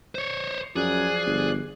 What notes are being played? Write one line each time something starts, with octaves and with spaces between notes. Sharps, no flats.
C5 C#5
F#2 F3 G#4 D5 F#6
G1